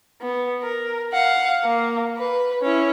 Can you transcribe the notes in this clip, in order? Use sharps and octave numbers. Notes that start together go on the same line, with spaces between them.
B3
A#4
F5 F#5
A#3
B4
C#4 E4